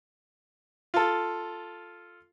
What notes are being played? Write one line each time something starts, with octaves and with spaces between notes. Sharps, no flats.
F4 A4